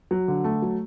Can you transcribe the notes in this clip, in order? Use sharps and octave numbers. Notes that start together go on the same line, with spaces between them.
F#3
D3
A3
F#3